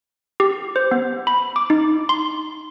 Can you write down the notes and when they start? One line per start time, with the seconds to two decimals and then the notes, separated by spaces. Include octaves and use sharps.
0.40 G4
0.76 C5
0.91 B3
1.27 B5
1.56 D6
1.70 D#4
2.09 C6